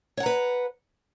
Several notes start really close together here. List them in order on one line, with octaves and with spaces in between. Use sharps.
C#5 F#5 A#5 B4